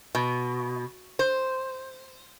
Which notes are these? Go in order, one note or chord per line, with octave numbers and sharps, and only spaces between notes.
B2
C5